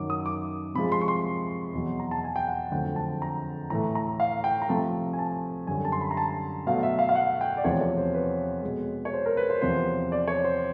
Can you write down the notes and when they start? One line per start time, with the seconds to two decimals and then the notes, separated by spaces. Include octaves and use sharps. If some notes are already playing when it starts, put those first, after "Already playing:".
Already playing: F#2 D#3 F#3 D6
0.10 D#6
0.26 D6
0.75 C3 F3 G#3 B5
0.92 C6
1.01 C#6
1.08 C6
1.74 E2 B2 F#3
2.00 A#5
2.11 A5
2.24 G#5
2.36 G5
2.47 F#5
2.72 F2 D3 F#3 A3 G5
2.96 A5
3.22 A#5
3.70 A2 E3 A3 A#5
3.95 A#5
4.20 F5
4.44 G5
4.62 A#5
4.69 C3 F3 A3 A5
5.13 G#5
5.19 A5
5.67 F#2 D3 G3 G#5
5.85 A5
5.92 C6
6.01 B5
6.11 A#5
6.17 A5
6.66 B2 F#3 A3 F5
6.83 E5
6.99 F5
7.09 F5
7.15 F#5
7.41 G5
7.57 D5
7.64 E2 C3 F3 A3 C#5
7.81 C#5
7.98 C5
8.14 B4
8.63 B2 G#3
9.05 C#5
9.13 C5
9.26 A#4
9.37 B4
9.50 C5
9.61 E2 C3 F3 C5
10.12 D5
10.28 C#5
10.44 C5